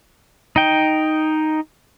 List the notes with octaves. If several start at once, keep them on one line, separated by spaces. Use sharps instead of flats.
D#4 G5